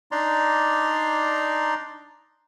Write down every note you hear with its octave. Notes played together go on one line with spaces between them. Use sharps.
D4 D#4 D5 A#5 C6